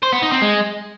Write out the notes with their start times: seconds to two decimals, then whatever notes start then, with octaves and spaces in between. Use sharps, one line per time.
0.03 C5
0.12 B3
0.22 D#4
0.32 C4
0.42 G#3